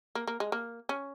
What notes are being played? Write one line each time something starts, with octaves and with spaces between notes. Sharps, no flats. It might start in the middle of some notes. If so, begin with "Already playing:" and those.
A#3
A#3
G#3
A#3
C#4